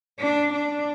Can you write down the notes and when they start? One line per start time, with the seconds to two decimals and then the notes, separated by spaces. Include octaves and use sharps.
0.20 D4
0.54 D4